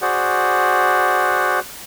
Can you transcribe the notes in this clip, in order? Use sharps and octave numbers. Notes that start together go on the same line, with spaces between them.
F#4 G#4 C5 D5 F#5